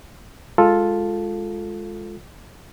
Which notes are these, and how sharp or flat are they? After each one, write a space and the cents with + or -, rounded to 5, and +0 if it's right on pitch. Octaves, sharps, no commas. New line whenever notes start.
G#3 +0 F4 +5 A4 +0